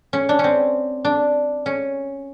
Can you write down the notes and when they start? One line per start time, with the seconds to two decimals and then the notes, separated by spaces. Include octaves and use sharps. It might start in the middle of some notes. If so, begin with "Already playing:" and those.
0.13 C#4
0.29 D4
0.39 C4 C#4
1.05 D4
1.66 C#4